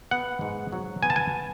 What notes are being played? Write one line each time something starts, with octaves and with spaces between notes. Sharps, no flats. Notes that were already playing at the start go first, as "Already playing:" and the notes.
B3 F#5
G#2
F#3
B3 G#5
A5
G#5